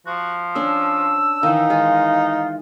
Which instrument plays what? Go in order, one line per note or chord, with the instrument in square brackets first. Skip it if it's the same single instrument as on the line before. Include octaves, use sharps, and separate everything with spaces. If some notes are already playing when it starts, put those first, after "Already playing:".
[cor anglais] F3 [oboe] F#4
[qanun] C#4 D4 [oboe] E6
[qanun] D#3 E3 [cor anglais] D#4 [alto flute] F5
[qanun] G#3 [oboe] F4